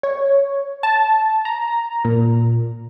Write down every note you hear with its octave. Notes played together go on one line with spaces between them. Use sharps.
C#5
A5
A#5
A#2